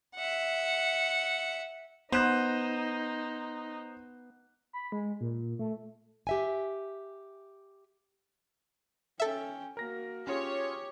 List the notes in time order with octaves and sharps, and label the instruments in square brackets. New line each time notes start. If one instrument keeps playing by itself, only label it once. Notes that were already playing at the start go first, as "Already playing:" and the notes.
[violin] E5 F#5
[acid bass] B3 [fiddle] D#4 [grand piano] C5 F#6
[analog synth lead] B5
G#3
A#2
A3
[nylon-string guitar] G4 E5 G#5
[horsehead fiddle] C#4 G5 [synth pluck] A4 E5
[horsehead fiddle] A#3 F#4 [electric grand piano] A#4 A#6
[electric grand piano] C#4 F4 G#4 [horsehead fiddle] G4 [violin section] C#5